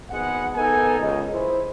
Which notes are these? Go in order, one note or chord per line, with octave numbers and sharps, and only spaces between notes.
G#1 G#3 B3 F#5
B3 D#4 A4 A#4 G#5
C#2 D#5
E4 C5